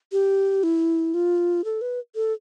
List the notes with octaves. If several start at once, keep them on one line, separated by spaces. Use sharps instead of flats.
G4
E4
F4
A4
B4
A4